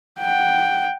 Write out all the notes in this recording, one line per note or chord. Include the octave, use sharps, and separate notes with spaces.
F#5 G5